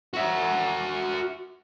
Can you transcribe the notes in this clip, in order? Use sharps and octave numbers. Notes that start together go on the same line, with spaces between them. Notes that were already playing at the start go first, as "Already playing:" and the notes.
F#4 E5